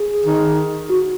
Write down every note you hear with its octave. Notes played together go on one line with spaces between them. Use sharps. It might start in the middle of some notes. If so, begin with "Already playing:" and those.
Already playing: G#4
D#3
F#4